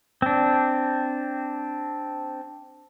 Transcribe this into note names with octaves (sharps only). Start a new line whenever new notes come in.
C4 D4